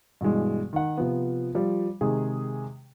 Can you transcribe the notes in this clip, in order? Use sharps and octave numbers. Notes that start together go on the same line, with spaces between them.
G2 B2 E3 G#3
D#3 F#5
C3 F3 B3
F3 G3
C3 D#3 G#3 G#4